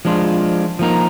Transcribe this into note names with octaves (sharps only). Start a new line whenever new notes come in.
F3 G#3 D4 F4
F3 A#3 D#4 A#4